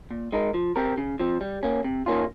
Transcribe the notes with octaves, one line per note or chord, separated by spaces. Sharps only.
A#2
G#3 D#4 A#4
F3
C4 G4 A#4
C#3
F3 C4
G3
A#3 C#4
C3
D#3 A#3 C#4 F4